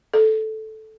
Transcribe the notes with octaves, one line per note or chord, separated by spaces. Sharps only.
A4